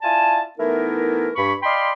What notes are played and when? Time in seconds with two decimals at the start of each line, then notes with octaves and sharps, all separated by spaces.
0.02 E4 F4 D5 G#5 A5
0.58 E3 A3 B3 D#4 E4 A#4
1.36 G2 B5 C#6
1.63 D5 D#5 F5 G5 B5 C6